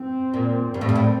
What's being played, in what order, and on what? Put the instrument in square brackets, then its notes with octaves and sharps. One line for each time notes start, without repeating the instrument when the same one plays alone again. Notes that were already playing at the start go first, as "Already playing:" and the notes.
Already playing: [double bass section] C4
[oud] A#2
[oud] G2 [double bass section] C4
[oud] A2
G2
A2